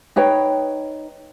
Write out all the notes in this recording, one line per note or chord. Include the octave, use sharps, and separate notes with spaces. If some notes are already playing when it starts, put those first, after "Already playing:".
D#4 B4 C#5 G5